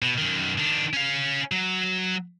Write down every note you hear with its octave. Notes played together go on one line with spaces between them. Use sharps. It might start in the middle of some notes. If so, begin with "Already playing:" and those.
B2
F#2 D#3
D#3 D4
C#4 F5
F#3